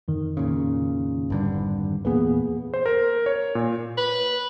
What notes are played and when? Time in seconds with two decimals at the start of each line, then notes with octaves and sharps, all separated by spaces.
0.08 F2 D#3
0.37 A#2 C#3
1.30 G#1 G2 D3
2.05 E2 A#2 A#3 B3 G#4 B4
2.74 C5
2.86 A#4
3.26 C#5
3.55 A#2
3.98 B4